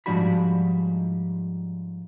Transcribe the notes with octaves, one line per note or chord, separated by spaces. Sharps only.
G#2 F3 G3 D4 F#4 B5